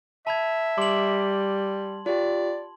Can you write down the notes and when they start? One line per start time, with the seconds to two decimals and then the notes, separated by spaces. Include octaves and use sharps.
0.27 E5 A5 B5 G#6
0.78 G3 C6 D6 F#7
2.06 F4 G4 D5